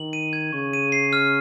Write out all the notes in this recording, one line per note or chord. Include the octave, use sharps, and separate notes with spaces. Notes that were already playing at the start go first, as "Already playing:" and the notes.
Already playing: D#3 F#7
D#7
G#6
C#3 C#6
D#7
C7
F6